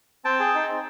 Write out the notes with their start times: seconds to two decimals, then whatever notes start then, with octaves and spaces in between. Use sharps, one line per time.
0.25 C4 G5 A5
0.40 G#4
0.54 D#4
0.68 C4